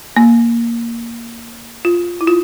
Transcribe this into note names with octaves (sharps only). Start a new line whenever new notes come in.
A#3
F4
E4
F4